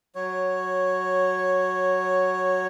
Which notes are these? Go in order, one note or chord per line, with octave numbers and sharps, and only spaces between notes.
F#3 C#5